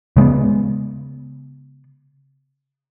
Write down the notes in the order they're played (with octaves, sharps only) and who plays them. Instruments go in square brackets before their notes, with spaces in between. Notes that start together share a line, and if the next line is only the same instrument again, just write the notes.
[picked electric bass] C#3 G#3 A#3 B3